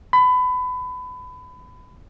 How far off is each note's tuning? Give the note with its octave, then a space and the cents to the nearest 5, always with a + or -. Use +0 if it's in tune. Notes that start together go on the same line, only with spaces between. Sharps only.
B5 +25